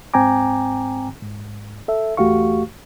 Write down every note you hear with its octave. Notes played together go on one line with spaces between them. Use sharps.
G#2 C4 G5 G#5 A#5 D6
G#2
A4 E5
E2 A3 F#4 G4 F5 C#6